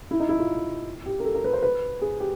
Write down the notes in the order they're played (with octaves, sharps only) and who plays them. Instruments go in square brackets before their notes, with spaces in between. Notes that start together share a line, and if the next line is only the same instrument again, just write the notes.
[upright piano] E4
D#4
E4
F4
G4
A#4
A4
A#4
B4
C5
B4
G#4
G4